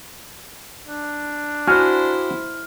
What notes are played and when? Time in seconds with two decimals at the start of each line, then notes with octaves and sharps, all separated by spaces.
0.88 D4
1.67 E4 F#4 C5 G#5 F6